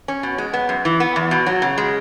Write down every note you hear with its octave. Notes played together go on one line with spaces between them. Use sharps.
C#4
B2
G#3
B3
F#2
E3
B3
E2
B2
F#3
C#3
G#3